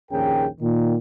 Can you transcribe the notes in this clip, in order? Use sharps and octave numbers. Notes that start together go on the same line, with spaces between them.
A#1 D#2 C#4 G#4 A#4 G5
A#2 D#3